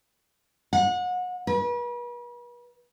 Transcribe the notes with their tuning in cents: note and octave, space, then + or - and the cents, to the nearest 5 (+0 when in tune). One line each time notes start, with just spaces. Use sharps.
F#5 -30
B4 -40